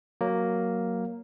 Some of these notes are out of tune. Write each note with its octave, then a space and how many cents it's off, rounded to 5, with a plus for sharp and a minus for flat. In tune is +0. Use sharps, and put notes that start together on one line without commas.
F#3 +0 A#3 +0